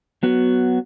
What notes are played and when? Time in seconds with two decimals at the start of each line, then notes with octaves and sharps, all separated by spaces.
0.23 F#3 B3 F#4